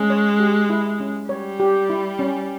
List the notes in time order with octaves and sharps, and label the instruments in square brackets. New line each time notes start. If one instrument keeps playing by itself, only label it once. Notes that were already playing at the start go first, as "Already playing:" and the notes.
Already playing: [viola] G#3 [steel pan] C#4
[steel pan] C#5
G4
E4
C#4
[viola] G3 [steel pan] C#5
[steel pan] G4
E4
C#4